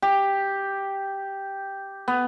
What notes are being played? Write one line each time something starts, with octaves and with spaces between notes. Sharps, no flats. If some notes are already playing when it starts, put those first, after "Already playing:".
G4
B3